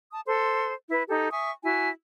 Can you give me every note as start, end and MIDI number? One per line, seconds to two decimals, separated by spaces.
0.11 0.20 81
0.11 0.20 87
0.26 0.73 69
0.26 0.73 72
0.26 0.73 84
0.89 1.03 64
0.89 1.03 71
1.08 1.30 63
1.08 1.30 67
1.08 1.30 69
1.31 1.51 76
1.31 1.51 80
1.31 1.51 85
1.31 1.51 87
1.63 1.89 64
1.63 1.89 66
1.63 1.89 80